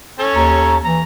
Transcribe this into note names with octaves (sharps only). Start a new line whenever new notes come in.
C#4 A4 C#5
D#2 A#5
E3 A#5